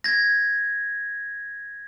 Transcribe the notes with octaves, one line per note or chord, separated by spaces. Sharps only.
G#6 A#6